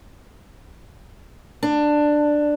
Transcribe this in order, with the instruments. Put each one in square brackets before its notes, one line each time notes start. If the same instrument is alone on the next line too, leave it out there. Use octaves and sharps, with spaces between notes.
[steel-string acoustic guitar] D4